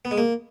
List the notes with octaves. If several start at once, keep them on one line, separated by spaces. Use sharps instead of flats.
B3
G#3
A#3